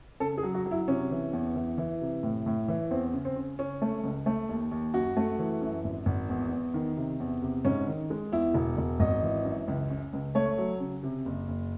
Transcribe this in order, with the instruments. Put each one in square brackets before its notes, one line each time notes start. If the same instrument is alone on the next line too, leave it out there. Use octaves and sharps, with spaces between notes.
[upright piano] C#3 A4
G#4
F#3
F#4
F#3
E4
C3 C#4
E3
E2
E3
E3
C3
A2
A2
E3
E2 C4
C#3
C4
C#3
C#3 C#4
A3
C#2
A3
D#2
D#2
F#2 F#4
A3
E3
F#2
G#1
G#1
E2
E2
D#3
C3
E2
C3
G#2 C#4
D#3
G#3
E2 E4
E1
E1
G#1 D#5
E3
F#2
C#2
C#3
C#2
A3 C#5
F#3
C#3
C3
F#1
F#1